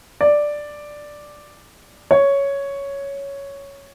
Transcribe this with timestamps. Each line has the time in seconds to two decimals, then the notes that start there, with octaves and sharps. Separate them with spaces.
0.21 D5
2.11 C#5